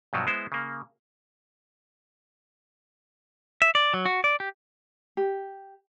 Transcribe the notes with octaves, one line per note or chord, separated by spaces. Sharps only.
G2 B2 F3 F#3
G#3 B3 E4 C5
C#3 A#3
E5
D5
F#3
F#4
D5
G4
G4